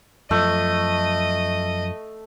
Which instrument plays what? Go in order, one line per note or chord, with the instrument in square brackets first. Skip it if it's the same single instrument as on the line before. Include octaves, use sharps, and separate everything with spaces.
[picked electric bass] F#2 F3 [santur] A3 [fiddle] D#5